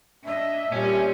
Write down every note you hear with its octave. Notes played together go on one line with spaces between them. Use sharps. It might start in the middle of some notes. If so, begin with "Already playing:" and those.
D4 D#5 E5
A#2 G3 C#4